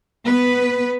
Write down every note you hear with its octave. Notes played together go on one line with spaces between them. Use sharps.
B3 B4